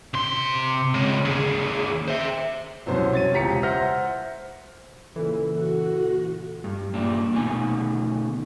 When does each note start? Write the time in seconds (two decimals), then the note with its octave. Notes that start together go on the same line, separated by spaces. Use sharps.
0.14 C3 C6
0.94 C#3 G#3
1.25 D#2 G#4
2.08 C5 E5
2.86 C2 F#2 B2 C#4 C5
3.13 C#5 A6 D#7
3.32 E1 C#2 G4 A#5 B6 C#7
3.63 C5 E5 F#5 F6 G6 A#6
5.16 A#2 C#3 E3 A4
5.58 F#4
6.64 G2
6.94 G2 A#2 D4
7.33 D2 B2 D#3 G#5